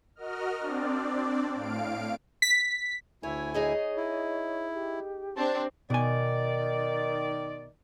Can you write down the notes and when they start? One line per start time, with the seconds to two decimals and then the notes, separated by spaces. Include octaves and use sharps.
0.15 F#4 A#4 D#5 F6
0.60 C4 D4 D5
1.54 A2 F5 D7
2.42 B6
3.23 D2 E4 C#5 E5 G#5
3.54 D#4 G#4 C#5 D#5
3.97 E4
4.74 G4
5.37 C4 D4 A5
5.90 B2 D#3 D5 G#5